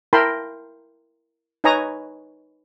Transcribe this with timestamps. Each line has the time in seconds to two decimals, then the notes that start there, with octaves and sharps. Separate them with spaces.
0.13 E4 A#4 G5 A5 B5 C6
1.64 D#4 B4 C#5 G#5 A#5 D#6